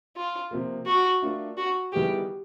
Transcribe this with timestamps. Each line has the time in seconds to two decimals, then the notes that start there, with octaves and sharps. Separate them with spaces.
0.16 F4
0.51 C3 F3 A#3
0.86 F#4
1.22 A3 D4 F4 A#4
1.57 F#4
1.92 D#3 G3 B3 E4 G4 G#4